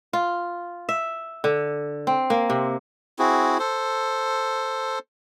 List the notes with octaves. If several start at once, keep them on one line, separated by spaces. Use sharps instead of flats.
F4
E5
D3
C4
A#3
C3
C4 E4 F#4 G#4
A4 C5